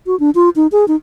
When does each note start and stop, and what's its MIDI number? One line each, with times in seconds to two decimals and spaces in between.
0.07 0.18 66
0.20 0.30 62
0.35 0.49 65
0.56 0.67 63
0.72 0.85 68
0.88 0.96 63